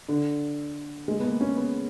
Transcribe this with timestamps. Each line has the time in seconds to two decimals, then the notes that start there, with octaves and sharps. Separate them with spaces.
0.08 D3
1.08 G#3
1.20 B3
1.24 A#3
1.41 C#4
1.56 B3